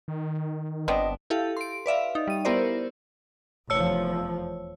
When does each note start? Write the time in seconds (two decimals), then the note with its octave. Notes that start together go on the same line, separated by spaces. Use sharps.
0.08 D#3
0.88 G1 B3 C4 D4 D#5
1.30 E4 G4 A4 F5
1.57 C6 D7
1.86 B4 D5 E5 F5
2.15 D#4
2.27 G3 D#7
2.45 B3 E4 G4 A#4 C5 D5
3.70 F1 E2 F3 C#5 A5 E6